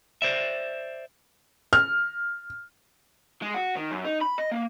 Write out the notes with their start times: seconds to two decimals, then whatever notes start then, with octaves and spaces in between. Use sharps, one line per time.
0.22 C5 D5 E5
1.73 F6
3.42 G#3
3.54 F#4
3.76 D#3
3.91 F#2
4.04 D#4
4.21 B5
4.38 D#5
4.51 A#3